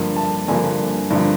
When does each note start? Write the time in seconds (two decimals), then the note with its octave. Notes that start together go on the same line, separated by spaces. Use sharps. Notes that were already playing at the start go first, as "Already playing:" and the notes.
Already playing: G2 D3 F3 A#3
0.16 A5
0.48 G2 D3 F3 A#3 G#5
1.10 G2 D3 F3 A#3